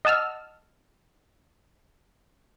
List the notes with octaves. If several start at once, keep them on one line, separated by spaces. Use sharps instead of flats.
D#5 F#5 A5 E6 F6